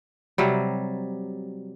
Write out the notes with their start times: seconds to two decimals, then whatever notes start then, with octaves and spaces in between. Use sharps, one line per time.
0.38 C3 F#3 G3